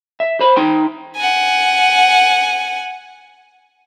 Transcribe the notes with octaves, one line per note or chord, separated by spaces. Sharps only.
E5
C5 B5
D#4 G5 C6
F#5 G#5